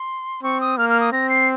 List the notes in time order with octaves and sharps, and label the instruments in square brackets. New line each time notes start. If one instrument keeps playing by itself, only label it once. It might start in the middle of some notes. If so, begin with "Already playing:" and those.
Already playing: [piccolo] C6
[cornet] C4 [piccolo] C#6
[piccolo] D#6
[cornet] A#3 [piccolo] F6
[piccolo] F6
D#6
[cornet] C4 [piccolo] A#6
[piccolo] C7